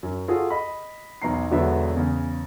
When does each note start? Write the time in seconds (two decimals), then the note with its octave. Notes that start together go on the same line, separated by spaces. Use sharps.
0.03 F#2
0.28 F4 F#4 G#4 A4
0.50 D#5 B5
1.22 B1 E2 B3 A#5 C7
1.51 E1 D3 F#3 B3 D4 E5
1.96 E2 C#3